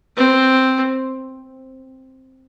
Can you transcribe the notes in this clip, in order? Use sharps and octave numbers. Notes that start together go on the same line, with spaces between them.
C4